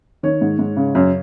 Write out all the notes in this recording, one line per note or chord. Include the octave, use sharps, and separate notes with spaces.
D#3 C#5
G#2
G#2
C#3
F#2